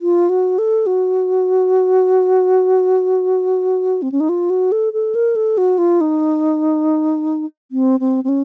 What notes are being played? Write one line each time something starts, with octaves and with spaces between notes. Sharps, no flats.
F4
F#4
A4
F#4
C4
C#4
D#4
F4
F#4
A4
A4
A#4
A4
F#4
F4
D#4
C4
C4
C4
C#4